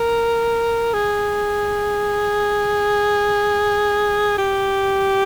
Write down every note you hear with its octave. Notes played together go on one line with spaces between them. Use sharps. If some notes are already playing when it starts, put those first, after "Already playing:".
Already playing: A#4
G#4
G4